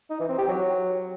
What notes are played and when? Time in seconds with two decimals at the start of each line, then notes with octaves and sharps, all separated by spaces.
0.10 D#4
0.20 E3
0.29 C4
0.39 G4
0.48 F#3